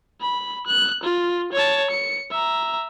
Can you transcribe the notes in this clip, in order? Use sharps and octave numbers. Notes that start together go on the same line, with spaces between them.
B5
F#6
F4
C#5 A5
C#7
E5 A#5